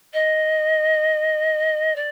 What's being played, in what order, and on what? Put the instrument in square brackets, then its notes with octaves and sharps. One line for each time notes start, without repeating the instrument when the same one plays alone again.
[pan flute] D#5
D5